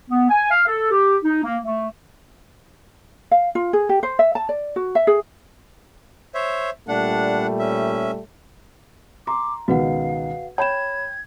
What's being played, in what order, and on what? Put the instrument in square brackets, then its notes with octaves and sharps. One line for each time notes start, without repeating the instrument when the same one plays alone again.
[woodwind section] B3
G#5
F5
A4
G4
D#4
A#3
A3
[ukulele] F5
F4
G#4
G4
C5
E5
A5
D5
F#4
E5
G#4
[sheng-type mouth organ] C5 C#5 E5
[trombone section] A#2 G3 A3 [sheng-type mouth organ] D4 F#5
[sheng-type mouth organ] C#4 E5
[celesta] A#5 [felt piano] C6 [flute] D6
[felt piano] C#2 B2 D#3 [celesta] F#4 B4 F#5 [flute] F5
[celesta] C#5 B5 E7 [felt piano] G5 [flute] G#6